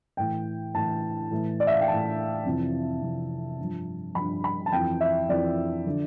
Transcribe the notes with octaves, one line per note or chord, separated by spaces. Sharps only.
A2 E3 G5
A2 E3 A5
A2 E3
D5
E5
F5
G5
A2 E3 A5
F2 C3 E3
F2 C3 E3
G2 F3
G2 F3 B5
B5
A5
F2 E3 G5
E5
F2 E3 D5
D3 F3